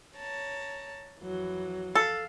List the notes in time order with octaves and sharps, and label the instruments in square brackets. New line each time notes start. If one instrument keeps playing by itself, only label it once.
[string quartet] C#5 A5 A#5
F2 E3 F#3
[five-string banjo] A4 [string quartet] F5